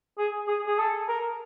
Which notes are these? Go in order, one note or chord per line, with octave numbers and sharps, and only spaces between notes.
G#4
G#4
G#4
A4
A#4